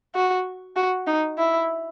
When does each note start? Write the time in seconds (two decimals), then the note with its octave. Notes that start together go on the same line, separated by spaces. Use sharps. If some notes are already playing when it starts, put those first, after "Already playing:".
0.15 F#4
0.76 F#4
1.07 D#4
1.38 E4